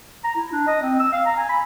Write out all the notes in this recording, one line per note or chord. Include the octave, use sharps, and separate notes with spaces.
A#5
E4
D4
D#5
C4
E6
F5
A#5
G#5
B5